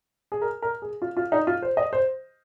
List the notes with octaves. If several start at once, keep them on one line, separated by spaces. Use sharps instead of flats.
G#4
A#4
A#4
G#4
F4
F4
D#4
F4
C5
D#5
C5